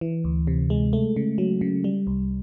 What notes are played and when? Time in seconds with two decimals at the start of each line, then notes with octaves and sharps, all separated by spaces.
0.01 E3
0.24 D2
0.47 C3
0.70 G#3
0.93 A3
1.16 C#3
1.38 F#3
1.61 C#3
1.84 G3
2.07 C2